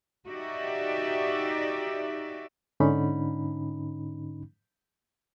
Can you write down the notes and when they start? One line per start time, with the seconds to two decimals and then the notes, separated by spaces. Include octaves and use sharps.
0.28 D#4 F#4 G4 D5 E5
2.80 G#2 D3 C#4 D#4 B5